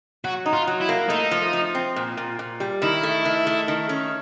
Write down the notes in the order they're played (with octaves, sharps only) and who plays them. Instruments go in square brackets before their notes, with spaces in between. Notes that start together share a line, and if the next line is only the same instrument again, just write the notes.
[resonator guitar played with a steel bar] F#3 [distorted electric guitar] F#4
[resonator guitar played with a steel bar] D#4
[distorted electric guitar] F4
[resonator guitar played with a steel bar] F#3
[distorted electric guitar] E4
[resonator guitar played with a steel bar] A#3
[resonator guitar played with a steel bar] A3 [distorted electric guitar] D#4
[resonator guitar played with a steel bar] F3
F3
C4
A#2
A#2
A#2
G3
[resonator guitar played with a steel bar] D#3 [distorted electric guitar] E4
[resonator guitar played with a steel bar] A3
D#3
A3
D#3
C#4